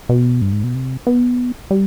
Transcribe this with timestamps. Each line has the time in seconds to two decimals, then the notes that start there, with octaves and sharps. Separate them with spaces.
0.09 B2
0.42 G2
0.52 G#2
0.64 B2
0.75 C3
1.07 B3
1.71 G3